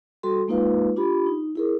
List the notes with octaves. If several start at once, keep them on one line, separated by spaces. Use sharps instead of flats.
G3 F#4 A4 C6
G#3 A#3 D#4 F4 B4 F5
D4 F4 G4 B5
D#4
E4 G#4 A#4